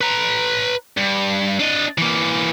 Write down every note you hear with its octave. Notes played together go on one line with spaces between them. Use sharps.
B4 A#5
G2
D4 D#5
E3 A#3